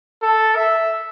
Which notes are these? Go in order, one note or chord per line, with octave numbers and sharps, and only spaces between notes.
A4
E5